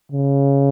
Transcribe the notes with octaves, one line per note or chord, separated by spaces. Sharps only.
C#3